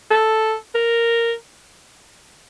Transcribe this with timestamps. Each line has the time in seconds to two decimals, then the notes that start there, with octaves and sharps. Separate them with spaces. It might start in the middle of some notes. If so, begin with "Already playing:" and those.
0.11 A4
0.75 A#4